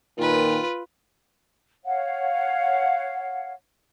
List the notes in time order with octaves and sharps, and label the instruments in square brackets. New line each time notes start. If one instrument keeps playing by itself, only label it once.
[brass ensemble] A#2 D#3 [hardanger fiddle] F4 B4
[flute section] C#5 F5 F#5